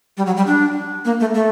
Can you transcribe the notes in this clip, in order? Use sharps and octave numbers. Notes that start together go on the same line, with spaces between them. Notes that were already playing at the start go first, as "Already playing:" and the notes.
G3
F#3
G3
D4
A#3
A3
A3